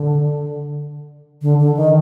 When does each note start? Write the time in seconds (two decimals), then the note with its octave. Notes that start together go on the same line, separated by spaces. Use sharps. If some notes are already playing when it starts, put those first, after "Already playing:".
Already playing: D3
1.42 D3
1.59 D3
1.77 D#3